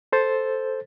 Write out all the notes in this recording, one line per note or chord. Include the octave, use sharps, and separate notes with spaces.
A4 C5 A6